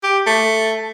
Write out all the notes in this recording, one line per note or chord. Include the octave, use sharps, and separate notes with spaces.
G4
A3